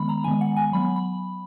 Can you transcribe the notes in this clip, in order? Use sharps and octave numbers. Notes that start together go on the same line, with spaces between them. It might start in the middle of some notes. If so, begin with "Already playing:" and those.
Already playing: D#3 G#3 B3 B5
A#5
D#3 G#3 B3 G#5
F#5
G#5
F#3 B3 B5
B5